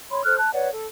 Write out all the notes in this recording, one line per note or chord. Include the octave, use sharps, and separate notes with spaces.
C#5 B5 C6
A4 C5 F6 F#6
A5 F#6
B4 C#5 D5 F#5
A4